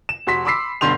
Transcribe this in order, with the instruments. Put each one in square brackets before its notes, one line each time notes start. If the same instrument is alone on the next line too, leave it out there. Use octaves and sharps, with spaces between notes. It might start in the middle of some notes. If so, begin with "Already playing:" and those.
[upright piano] E7
F1 F#4 C6 B6
B5 C6 D6 E6 B6 C7
B1 G2 D3 C6 G6 F7